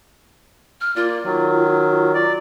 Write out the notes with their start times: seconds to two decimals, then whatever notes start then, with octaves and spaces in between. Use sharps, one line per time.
0.80 F6
0.96 A#3 F4 D5
1.24 D#3 F#3
2.14 D5